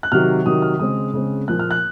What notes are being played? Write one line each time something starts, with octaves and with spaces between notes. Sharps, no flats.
F#6
C3 D#3 F#3 F6
C3 D#3 F#3 D#6
F6
C#3 G#3 C4 D#6
C#3 G#3 C4
A#2 F3 A#3 F#6
F6
F#6